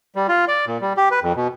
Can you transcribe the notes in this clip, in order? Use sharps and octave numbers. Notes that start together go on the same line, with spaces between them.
G3
F4
D5
A#2
G3
G4
B4
F2
B2